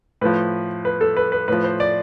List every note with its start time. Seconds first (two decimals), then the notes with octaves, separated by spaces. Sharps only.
0.21 A2 F3 B4
0.85 B4
1.01 A4
1.17 B4
1.32 B4
1.48 A2 F3 B4
1.64 C5
1.80 D5